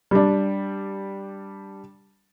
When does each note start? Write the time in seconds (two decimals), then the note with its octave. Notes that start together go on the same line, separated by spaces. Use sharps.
0.11 G3 D4